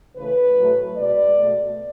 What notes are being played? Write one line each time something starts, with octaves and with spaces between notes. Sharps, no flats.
C#3 E3 A3 B4
A2 F#3 A3
B2 G#3 D5
B2 A3